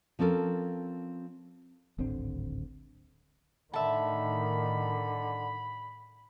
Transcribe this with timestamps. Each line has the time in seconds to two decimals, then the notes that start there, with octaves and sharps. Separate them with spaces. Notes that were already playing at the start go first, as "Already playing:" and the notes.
0.19 F3 C4 C#4 A4 A#4
1.98 D1 G#1 D3 C4
3.74 A2 D3 D#3 E5 A5 B5